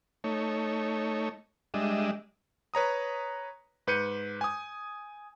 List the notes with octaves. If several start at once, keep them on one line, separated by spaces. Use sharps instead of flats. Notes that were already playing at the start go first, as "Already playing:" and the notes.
A3 D#4 C#5
G3 G#3 D4 D#5 E5
B4 C#5 A#5 D#6
G#2 B4 G6 C#7 D#7
G#5 D#6